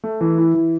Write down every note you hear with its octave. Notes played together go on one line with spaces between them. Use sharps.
A3
E3
E4
E3